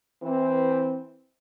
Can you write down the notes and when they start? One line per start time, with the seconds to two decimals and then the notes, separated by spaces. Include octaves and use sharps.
0.23 E3 C4